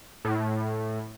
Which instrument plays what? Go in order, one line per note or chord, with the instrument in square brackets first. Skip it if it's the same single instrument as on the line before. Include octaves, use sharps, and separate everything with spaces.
[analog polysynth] A2